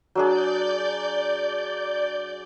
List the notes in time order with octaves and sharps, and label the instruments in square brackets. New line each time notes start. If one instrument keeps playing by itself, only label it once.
[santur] F#3 D4 G#4 [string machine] D5 G6